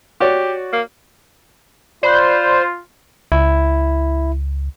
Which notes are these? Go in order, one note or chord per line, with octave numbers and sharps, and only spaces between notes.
F#4 G4 C#5 D5
A#3
F4 C5 D5 B5 F#6
C#2 E4